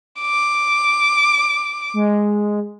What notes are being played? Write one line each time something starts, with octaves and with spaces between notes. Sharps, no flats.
D6
G#3